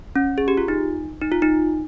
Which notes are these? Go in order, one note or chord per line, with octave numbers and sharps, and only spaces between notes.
C#4
G#4
G4
F4
D#4
D#4
F4
D#4